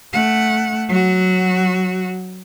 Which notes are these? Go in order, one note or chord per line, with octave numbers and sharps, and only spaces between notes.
A3 F#5
F#3 F#4